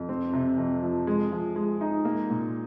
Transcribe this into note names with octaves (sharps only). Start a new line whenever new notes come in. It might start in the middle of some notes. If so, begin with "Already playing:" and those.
Already playing: F2
C4
C3
F2
F3
G#3
F3
G#3
D#4
A#3
A#2